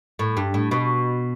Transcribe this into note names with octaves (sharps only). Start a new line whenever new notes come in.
A2
G2
A2
B2